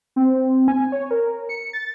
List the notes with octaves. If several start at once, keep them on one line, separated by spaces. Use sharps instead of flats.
C4
G#5
C#5
A#4
C#7
A6